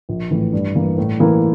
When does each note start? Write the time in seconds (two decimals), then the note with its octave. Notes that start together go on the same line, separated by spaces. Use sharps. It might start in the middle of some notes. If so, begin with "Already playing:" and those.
0.09 A#1
0.31 A2 E3
0.53 G2
0.75 E3 A#3
0.98 A2
1.20 E3 A#3 E4 A#4